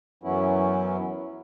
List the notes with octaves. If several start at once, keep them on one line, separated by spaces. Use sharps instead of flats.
F#2 E3 F#3 B3 C#4 E4